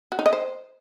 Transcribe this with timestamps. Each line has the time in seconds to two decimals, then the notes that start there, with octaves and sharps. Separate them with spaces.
0.12 F#4
0.19 D#4
0.26 D#5
0.33 C5